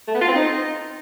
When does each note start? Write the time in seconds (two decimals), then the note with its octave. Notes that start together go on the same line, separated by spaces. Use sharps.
0.08 A3
0.15 B3
0.21 F4
0.28 C4
0.35 D#4